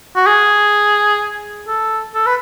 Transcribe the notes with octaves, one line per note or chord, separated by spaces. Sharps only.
F#4
G#4
A4
A4
B4